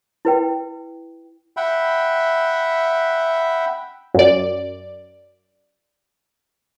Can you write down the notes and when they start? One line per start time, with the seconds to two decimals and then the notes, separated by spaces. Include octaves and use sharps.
0.25 E4 B4 G5
1.57 E5 F#5 G5 B5
4.14 F#2 D5